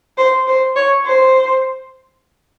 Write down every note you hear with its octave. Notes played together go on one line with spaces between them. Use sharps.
C5
C5
C#5
C5